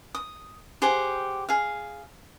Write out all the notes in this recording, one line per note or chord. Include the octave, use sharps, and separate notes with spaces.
D#6
G4 G#4 C5 F#5
G#4 F5